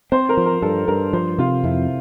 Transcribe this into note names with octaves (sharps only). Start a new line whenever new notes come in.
C4 C5
A#4
F3
A#4
G2 A4
G2 A#4
F3 C5
C3 F4
F2 E4